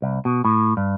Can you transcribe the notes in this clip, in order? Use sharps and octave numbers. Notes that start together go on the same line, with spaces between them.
C2
B2
A2
G2